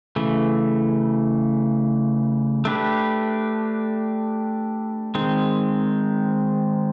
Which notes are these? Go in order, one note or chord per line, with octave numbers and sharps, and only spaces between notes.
C#3 E3 A3
A3 D4 G4 B4
D#3 G#3 C4